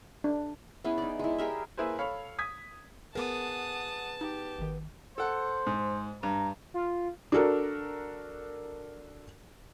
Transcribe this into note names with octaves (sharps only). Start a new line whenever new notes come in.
D4
B3 C#4 E4 G#4
D#4 D5
G#3 E4
G4 G#4 A#4 E5
A#3 E4 G#4 B4 C5
A4 C#5 F5 B5
D#6 G#6 B6
B3 G#4 A#4 F#5 A5 D#6
D#4 G4
G#1 D#3
A4 C5 F#5
G#2
G2 A#5
F4
D4 F#4 A4 A#4